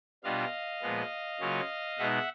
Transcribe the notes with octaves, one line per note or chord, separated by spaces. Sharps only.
B2 G3 B3 D4 F4 D#5 F5
A#2 F3 G#3 B3
C#3 F#3 A#3 C#4 F4
B2 G#3 B3 D#4 E5 F#5